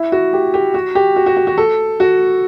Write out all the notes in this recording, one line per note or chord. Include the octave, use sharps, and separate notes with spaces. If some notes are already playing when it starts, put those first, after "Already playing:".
Already playing: E4
F#4
G4
G4
F#4
G4
F#4
F#4
F#4
F#4
A4
F#4